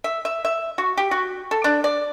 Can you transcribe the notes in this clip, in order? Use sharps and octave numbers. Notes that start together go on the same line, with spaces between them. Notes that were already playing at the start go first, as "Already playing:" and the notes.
E5
E5
E5
F#4
G4
F#4
A4
D4
D5